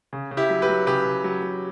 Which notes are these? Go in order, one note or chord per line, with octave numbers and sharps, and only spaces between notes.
C#3
C#3
E4 G4
F#3
G4 B4
F#3
C#3 G4 B4
C#3
F#3
F#3